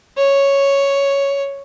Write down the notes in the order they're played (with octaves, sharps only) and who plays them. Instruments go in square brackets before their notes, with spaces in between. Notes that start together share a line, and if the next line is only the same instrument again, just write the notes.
[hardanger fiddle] C#5